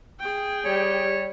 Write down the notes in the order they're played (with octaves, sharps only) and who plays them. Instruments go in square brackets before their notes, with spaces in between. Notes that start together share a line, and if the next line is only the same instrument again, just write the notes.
[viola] G#4 G5
[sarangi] G3 [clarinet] C#5